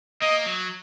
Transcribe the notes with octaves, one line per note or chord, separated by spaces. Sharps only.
A#3 D#5
F#3